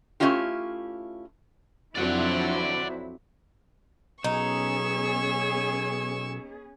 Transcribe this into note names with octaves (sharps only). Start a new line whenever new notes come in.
A3 A#3 C#4 E4 F4 G4
F2 F#3 C4 D4 E4 D5 F#5
B1 B3 C#4 D#4 G#4 C#6 E6